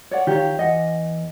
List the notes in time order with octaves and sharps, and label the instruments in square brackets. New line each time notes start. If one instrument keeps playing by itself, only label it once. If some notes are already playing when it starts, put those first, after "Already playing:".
[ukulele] C#5 D5 F#5
[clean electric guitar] D#3 F4 [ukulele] G4 C#5
[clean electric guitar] E2 [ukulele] D#5 F#5